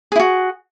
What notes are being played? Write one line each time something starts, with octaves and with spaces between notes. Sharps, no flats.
E4 F#4 G#4